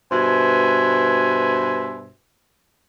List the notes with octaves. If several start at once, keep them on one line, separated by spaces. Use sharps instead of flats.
G2 B2 C5 E5 G#5